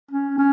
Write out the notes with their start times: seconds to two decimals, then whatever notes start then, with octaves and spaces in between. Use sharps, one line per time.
0.11 C#4
0.38 C#4